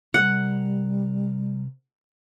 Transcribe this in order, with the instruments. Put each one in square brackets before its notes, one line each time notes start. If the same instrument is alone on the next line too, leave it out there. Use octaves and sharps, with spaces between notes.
[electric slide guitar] C3 A#4 [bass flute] G3 [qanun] F#5